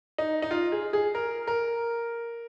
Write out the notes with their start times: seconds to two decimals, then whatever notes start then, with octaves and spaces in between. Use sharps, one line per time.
0.18 D#4
0.42 D#4
0.51 F4
0.72 G#4
0.93 G#4
1.15 A#4
1.47 A#4